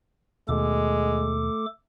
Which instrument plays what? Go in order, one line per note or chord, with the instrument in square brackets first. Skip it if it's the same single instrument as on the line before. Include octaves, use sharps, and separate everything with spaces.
[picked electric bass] D#2 B2 [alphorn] G#3 [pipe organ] A3 A4 D6